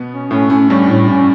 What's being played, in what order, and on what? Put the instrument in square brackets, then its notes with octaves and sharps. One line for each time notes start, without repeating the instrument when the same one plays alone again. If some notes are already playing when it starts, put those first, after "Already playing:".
Already playing: [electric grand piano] B2 B3
[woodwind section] C#4
[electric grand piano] A2 A3 [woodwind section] C#4
[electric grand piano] A2 A3 [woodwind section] C#4
[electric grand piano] G2 G3 [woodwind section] C#4
[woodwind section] A2
C#4